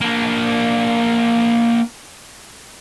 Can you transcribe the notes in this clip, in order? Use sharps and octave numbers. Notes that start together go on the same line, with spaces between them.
A#3 D4